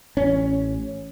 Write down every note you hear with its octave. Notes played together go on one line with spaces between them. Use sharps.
A1 C#4